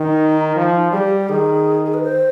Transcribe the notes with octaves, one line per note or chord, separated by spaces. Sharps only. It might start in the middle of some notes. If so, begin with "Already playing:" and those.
Already playing: D#3 D#4
F3
G3 G#4
G4
D#3 G#4
G#4
B4
C5